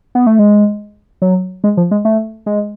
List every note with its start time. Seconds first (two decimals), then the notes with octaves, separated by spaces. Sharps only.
0.15 B3
0.27 A3
0.39 G#3
1.22 F#3
1.64 G#3
1.77 F3
1.91 G#3
2.05 A3
2.46 G#3